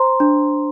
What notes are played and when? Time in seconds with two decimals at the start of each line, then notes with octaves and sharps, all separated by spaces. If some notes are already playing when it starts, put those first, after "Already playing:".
Already playing: C5 A#5 C6
0.20 D4